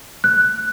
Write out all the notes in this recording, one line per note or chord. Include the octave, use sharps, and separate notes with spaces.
F#6